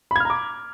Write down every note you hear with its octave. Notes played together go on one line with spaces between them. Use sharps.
A#5 B5 D6 F6 G#6